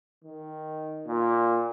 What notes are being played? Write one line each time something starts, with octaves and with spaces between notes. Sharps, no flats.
D#3
A#2